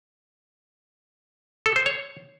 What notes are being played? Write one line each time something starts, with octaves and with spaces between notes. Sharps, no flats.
A4
C5
C#5